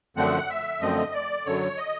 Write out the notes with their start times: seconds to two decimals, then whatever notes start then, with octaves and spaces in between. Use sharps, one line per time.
0.17 F#2 D3 F3 A3 C4 F#5
0.50 E5
0.81 F#2 D3 F3 A3 C4 D#5
1.14 D5
1.46 F#2 D3 F#3 C#5
1.77 D#5